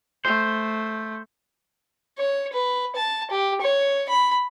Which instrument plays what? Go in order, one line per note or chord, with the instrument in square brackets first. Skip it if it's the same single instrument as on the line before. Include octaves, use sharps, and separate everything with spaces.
[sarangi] A3 [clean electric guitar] C5
[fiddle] C#5
B4
A5
G4
C#5
B5